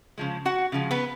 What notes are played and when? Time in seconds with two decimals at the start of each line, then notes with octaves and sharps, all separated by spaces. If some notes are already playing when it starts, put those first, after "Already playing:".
0.18 C#3 F3 G#3
0.45 F#4 F#5
0.72 C#3 F3 G#3
0.91 B3 B4